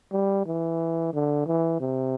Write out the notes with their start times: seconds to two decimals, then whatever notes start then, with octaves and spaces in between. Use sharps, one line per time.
0.12 G3
0.46 E3
1.14 D3
1.47 E3
1.80 C3